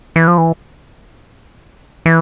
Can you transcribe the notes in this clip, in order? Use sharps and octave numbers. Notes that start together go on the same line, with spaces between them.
E3
F3
E3
E3